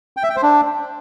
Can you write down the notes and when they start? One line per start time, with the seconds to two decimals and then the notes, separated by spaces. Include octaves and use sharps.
0.17 G5
0.23 E5
0.30 G5
0.36 C5
0.43 D4